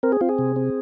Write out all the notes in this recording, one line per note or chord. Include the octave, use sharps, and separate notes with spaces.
C4 A#4
G#4
C4 F4
G#4
C3
C4